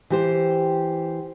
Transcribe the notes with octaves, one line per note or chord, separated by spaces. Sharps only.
E3 G4 C5